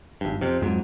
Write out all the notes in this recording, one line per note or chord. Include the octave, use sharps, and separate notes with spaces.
G#1 G2
F2 C3
F2 G#2 F#3